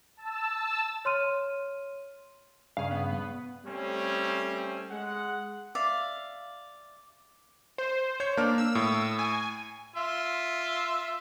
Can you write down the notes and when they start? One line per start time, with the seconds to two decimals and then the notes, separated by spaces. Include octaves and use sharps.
0.17 A5 E6
1.05 C#5 C6 F6 D#7
2.77 G2 C#3 G#4 F5
2.91 B3
3.65 G3 A3 C4 C#4
4.90 G#3 F#5
5.75 D5 E5 F5
7.78 C5
8.20 C#5 G6
8.37 A#3 D4 F6
8.58 E6
8.75 A2
9.19 G#5
9.96 F4 E5